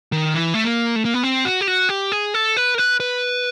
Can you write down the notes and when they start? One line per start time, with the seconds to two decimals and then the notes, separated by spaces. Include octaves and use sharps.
0.12 D#3
0.34 E3
0.54 A3
0.64 A#3
0.96 A3
1.05 A#3
1.14 B3
1.23 C4
1.45 F#4
1.61 G4
1.68 F#4
1.89 G4
2.12 G#4
2.34 A4
2.57 B4
2.74 A#4
2.78 B4
3.00 B4